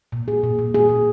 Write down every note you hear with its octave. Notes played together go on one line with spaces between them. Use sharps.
A#2
G#4
A#2
A#2
G#4
A#2